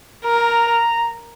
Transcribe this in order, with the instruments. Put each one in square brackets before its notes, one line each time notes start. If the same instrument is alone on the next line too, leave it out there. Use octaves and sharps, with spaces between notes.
[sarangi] A#4 [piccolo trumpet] A#5